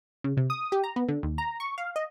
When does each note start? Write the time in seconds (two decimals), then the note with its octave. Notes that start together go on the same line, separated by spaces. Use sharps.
0.24 C#3
0.37 C3
0.50 D#6
0.72 G4
0.84 A#5
0.96 B3
1.08 D3
1.23 D#2
1.38 A#5
1.60 C#6
1.78 F5
1.96 D#5